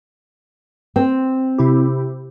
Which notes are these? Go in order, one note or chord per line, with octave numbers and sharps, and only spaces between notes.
C4
C3 E4 G4